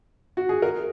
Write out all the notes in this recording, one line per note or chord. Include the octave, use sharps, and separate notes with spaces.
F#4
G#4
A#4